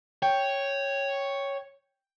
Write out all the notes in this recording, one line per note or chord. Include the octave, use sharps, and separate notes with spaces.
C#5 G5